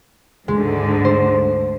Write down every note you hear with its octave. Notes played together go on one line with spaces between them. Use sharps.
D2 G#2 D3 G#3
C5